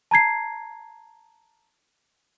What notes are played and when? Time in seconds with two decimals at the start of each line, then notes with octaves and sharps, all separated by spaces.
0.11 A5 A#5 G#6 C7